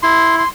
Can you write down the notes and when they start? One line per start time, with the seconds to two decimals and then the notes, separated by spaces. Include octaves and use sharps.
0.03 E4 C6
0.39 C6